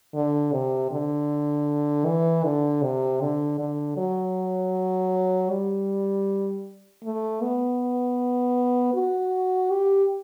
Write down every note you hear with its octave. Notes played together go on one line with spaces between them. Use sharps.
D3
C3
D3
E3
D3
C3
D3
D3
F#3
G3
A3
B3
F#4
G4